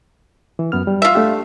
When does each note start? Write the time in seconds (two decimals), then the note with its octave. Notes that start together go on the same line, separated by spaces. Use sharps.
0.59 E3
0.72 F#2 B3 F6
0.87 G3
1.02 F4 E5
1.15 A3 D4 G4